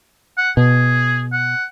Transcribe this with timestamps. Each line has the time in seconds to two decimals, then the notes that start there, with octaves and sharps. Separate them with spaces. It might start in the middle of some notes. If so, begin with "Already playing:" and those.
0.38 F#5
0.57 B2 G#4
1.33 F#5